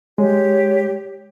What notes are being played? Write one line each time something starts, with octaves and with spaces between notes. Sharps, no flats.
G#3 G4 C#5